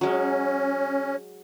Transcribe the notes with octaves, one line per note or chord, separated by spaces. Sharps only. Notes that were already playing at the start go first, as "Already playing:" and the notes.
F#3 G#3 C#4